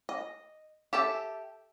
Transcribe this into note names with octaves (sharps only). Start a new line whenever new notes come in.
D#5
G4 A4 E5 A5